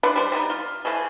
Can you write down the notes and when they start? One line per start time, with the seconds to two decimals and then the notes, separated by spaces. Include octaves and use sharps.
0.03 D3 D4 B4 F#5
0.16 G3 D4 C5
0.32 G3 B3 D#4
0.50 F4
0.85 E3 F3 A3 G#4